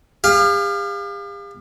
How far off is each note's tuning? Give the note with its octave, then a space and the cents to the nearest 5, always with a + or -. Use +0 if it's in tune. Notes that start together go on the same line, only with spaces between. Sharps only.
G4 +45 F5 +0